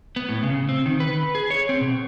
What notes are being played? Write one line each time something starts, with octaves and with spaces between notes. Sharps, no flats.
B3
A2
C#3
C4
D#3
B4
G#4
C#5
C4
B2